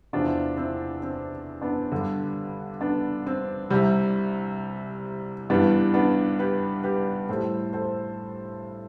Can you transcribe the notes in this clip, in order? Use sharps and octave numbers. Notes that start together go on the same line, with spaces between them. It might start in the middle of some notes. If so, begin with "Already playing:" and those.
E2 C3 F3 D4 F4
C4 E4
C4
B3 D4
G2 D3 G3
B3 D4
C4
C2 C3 G3 C4
G2 E3 G3 B3 D4
B3 D4
G4 B4
G4 B4
A2 G3 A4 C5
A4 C5